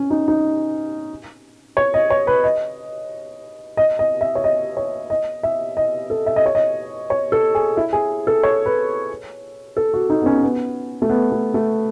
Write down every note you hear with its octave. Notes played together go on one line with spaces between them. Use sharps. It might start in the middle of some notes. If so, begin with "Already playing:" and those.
Already playing: C#4
D#4
D#4
C#5
D#5
C#5
B4
D#5
D#5
D#5
E5
C#5
D#5
C#5
D#5
E5
D#5
A4
E5
D#5
C#5
D#5
C#5
A4
G#4
E4
G#4
A4
C#5
B4
A4
F#4
D#4
B3
C#4
B3
A3
B3
A3
A3